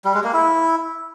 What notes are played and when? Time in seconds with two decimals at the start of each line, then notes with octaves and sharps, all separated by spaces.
0.05 G3
0.14 G#3
0.24 A#3
0.34 E4